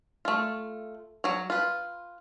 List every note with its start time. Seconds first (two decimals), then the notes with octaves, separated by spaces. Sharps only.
0.25 A3 F4
1.24 F#3 C#5
1.50 F4 B4